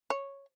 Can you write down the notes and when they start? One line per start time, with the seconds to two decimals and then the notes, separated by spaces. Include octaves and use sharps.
0.10 C#5